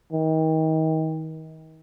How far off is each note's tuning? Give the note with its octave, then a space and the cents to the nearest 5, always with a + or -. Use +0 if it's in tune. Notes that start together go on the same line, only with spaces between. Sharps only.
D#3 +35